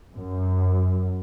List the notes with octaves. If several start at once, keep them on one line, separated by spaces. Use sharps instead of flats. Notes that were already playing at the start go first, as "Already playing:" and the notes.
F#2